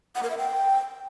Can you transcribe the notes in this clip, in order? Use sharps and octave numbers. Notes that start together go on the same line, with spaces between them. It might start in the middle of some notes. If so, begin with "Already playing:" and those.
F#5
A#4
E5
G5